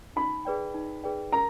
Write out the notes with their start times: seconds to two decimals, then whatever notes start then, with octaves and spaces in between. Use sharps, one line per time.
0.16 D#4 B5
0.45 G#4 B4 D5 G5
0.74 D#4
1.03 G#4 B4 D5 G5
1.32 A#4 A#5